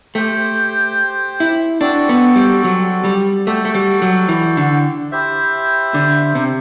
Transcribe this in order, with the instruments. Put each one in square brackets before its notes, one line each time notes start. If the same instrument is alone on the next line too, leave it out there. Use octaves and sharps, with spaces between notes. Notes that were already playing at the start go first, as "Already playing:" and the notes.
[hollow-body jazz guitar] A3 [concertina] G4 C5 G5
[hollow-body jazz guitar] E4
[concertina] C4 F#4 A4 D5 [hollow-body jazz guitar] D4
[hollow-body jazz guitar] B3
G3
F#3
G3
[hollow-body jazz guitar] A3 [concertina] F#4 A4 D5 G5
[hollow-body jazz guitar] A3
G3
F#3
E3
D3
[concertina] E4 G4 C5 E5
[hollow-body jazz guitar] D3
C3